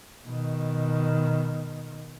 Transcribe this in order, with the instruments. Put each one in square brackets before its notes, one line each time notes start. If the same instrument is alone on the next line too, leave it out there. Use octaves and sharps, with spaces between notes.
[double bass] B2 D#3